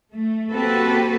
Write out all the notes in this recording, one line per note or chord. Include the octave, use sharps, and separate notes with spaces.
A3
A#3 C4 F#4 G4 A4 B4